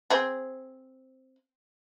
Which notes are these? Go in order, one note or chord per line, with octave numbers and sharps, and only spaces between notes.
C4 G#4